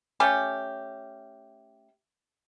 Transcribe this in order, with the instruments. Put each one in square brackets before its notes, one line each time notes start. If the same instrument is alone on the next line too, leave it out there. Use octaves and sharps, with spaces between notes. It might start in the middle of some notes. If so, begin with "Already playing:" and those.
[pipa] A3 C#4 G4